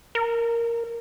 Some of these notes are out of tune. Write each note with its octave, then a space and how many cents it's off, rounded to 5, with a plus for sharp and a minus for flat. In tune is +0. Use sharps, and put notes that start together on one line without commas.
A#4 +0